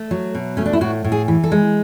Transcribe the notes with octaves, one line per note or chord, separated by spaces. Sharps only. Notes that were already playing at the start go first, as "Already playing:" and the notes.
Already playing: A3
F#3
B2
A3 C#4
D4
E4
A2 F#4
A2
G#4
E3
A4
G#3